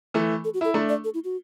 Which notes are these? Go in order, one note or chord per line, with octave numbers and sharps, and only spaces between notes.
E3 A3
A4
F#4
E4 A4
A3 D4
D5
A4
E4
F#4